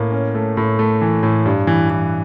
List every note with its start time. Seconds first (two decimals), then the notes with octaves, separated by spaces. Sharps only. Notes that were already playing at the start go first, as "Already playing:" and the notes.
Already playing: A2 A#3
0.12 C#4
0.35 A3
0.57 A2
0.79 A3
1.02 E3
1.23 A2
1.46 G2
1.67 E3
1.90 E3